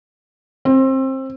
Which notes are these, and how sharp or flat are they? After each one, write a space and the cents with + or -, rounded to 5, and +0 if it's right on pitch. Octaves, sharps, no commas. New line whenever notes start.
C4 +25